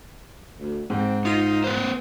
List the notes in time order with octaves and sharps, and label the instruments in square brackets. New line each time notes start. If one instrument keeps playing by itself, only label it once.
[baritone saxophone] D2
[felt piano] G#2 [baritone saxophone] C4
[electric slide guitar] D#4 [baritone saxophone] F4
[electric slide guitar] B3 B4 C5